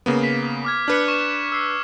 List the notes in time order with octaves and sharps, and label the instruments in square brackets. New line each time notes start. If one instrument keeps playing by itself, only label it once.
[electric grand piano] C#3 A#3 B3
[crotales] B6
D6 F6 G#6
[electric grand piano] D4 B4 [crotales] F6 C#7
[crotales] C#6 E7
E6 C7